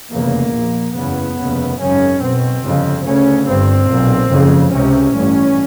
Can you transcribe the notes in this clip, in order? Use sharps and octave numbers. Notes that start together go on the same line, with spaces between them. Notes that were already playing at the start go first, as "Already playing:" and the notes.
F1 E2 C#3 A#3
A#1 A#2
F#1 E2 C#3 B3
F1 D#2 C#3
G#1 F#2 C#3 C#4
B1 B2 C4
G1 F2 C#3
D2 C#3 C#4
G1 G2 C4
B1 A#2
F#1 F2 C#3
C#2 C3 C#4
A1 G2